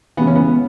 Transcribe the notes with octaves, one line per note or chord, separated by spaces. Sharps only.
C#2 C#3 E3 B3
C#4
B3